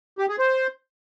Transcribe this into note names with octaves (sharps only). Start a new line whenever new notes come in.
G4
G#4
C5